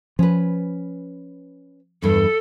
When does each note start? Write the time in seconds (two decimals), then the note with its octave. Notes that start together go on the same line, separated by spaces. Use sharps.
0.19 F3 C#4 B4
2.02 E2 G2 A4